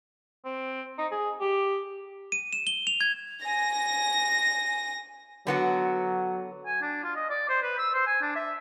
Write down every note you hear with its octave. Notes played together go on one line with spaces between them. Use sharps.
C4
D#4
G#4
G4
D#7
E7
G7
F7
G#6
G#5 A#6
D3 F#3 B3 F#4
G#5
D4
F4
D#5
D5
C5
B4
E6
C5
G#5
D4
E5